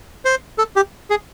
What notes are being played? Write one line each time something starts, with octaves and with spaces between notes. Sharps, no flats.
C5
A4
G4
G#4